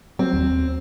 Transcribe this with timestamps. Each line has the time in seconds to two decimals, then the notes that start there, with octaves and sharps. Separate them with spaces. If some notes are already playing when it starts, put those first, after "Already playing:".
0.19 F#3 C4
0.34 D#2